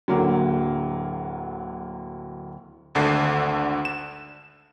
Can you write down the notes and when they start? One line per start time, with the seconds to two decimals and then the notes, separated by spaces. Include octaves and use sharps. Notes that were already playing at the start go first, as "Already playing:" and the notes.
0.08 D1 D3 F#3 A#3
2.95 G#1 D2 D3 A4 C7
3.85 E7